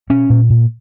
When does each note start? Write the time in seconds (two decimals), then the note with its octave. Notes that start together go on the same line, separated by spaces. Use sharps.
0.10 B2 C#4
0.30 A#2
0.50 A#2